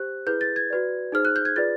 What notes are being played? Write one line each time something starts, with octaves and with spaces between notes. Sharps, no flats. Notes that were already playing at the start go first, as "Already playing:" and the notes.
Already playing: G4 C5 F#6
E4 G#4 B4 G6
A6
G#6
F#4 B4 D5
D#4 G#4 C5 F6
F#6
G6
G#6
F4 G#4 B4 D5 A6